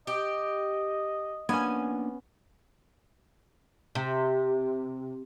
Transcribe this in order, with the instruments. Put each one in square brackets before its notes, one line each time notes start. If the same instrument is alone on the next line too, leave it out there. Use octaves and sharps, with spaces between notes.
[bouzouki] G4 [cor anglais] D#5
[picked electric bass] A#3 D4 [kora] B3 C#4 [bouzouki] G#5
[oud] C3